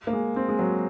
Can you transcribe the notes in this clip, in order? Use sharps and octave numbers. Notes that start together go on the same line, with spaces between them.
A#3
G#3
C4
G#3
F#3